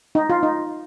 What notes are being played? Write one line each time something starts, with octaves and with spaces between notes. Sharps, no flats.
D#4
F4
D#4